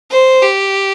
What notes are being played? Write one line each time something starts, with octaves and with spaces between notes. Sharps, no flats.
C5
G4